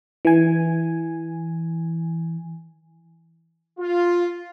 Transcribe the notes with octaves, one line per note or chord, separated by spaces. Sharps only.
E3 G#5
F4